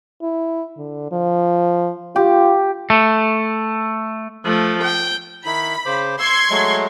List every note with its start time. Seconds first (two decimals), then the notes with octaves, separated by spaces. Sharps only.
0.22 E4
0.77 D3
1.12 F3
2.16 F4 G4
2.90 A3
4.45 F3 A3
4.84 G5
5.46 D#3 D#4 E4 B5
5.86 C#3 C5 D6
6.20 C6 C#6 E6 G#6
6.50 F#3 G#3 A3